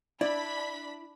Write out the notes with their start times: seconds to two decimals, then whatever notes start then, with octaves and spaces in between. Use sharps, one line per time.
0.21 D4 E4 D5 B5 B6